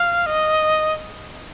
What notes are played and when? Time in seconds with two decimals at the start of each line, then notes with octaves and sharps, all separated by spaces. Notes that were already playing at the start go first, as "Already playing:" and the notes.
Already playing: F5
0.26 D#5